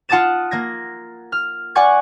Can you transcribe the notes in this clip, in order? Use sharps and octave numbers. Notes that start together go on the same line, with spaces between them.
F4 F#5 A5 D#6 A6 E7
A#3 G#6 A#6
F6
D5 F#5 G#5 C#6 G#6